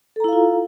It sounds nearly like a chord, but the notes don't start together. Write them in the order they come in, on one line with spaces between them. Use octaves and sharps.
A4 A#5 E4 F5 F4